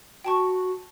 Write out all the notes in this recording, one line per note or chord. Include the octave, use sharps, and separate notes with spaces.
F#4 G5 A5 C#6